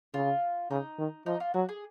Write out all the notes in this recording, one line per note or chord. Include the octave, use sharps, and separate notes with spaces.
C#3 F4
C#3 D#4
D#3
F3 D#4
F4
F#3 F#4
G#4